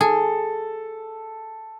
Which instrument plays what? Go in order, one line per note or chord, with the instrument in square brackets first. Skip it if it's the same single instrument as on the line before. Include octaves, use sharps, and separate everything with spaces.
[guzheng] G#4 [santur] A4